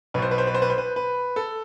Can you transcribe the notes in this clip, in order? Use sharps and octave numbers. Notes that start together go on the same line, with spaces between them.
B1 B2 B4 C5
B4
C5
B4
C5
B4
C5
B4
B4
A4